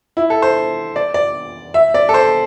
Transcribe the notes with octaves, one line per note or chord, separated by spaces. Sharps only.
E4
A4
C5
D5
D5
E5
D5
A4
C5